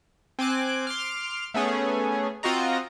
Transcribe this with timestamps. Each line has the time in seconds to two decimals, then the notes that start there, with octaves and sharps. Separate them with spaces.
0.39 C4 G#5 D6 F#6
0.87 C6 D6 F6
1.54 A3 B3 C#4 G#4
2.43 C4 F4 F#4 D#5 A#5